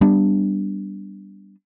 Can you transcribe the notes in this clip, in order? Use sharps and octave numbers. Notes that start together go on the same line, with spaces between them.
G3 B3 D4